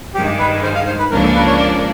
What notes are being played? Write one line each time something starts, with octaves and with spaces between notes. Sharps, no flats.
G2 D#3 G#3 G4
B4
C5
F5
C5
B4
C#2 C#3 F3 A#3 D4 A#4
A4
B4
C#5
D5